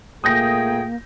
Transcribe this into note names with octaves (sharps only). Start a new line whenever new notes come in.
A#2 A3 A#3 G#4 G5 D#6 G6 A#6